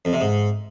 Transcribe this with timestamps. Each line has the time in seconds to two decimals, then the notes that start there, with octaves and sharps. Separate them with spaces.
0.05 F2
0.13 C3
0.21 G#2